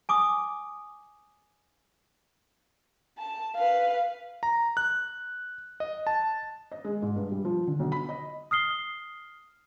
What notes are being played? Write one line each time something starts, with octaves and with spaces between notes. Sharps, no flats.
G#5 D6 D#6
A5
B4 F5
A#5
F#6
D#5
A5
D#5
G#3
G#2
G2
G3
F3
D3
B1
B5
D#5
D#6 F6 C7 G7